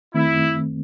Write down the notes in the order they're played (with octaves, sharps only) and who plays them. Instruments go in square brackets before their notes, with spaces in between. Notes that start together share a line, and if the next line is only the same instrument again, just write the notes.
[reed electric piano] D#3 A3 C4 [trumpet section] E4